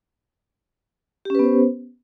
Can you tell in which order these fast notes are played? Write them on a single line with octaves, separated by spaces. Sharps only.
G4 C#4 B4 B3 C5